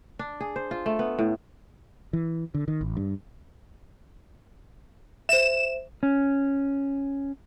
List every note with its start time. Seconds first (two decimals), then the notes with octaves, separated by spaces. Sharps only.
0.19 D4
0.40 G#4
0.56 C5
0.71 F4
0.86 A3
0.99 B3
1.19 A2
2.13 E3
2.54 D3
2.68 D#3
2.81 A1
2.97 G2
5.29 C5 E5 E7
6.03 C#4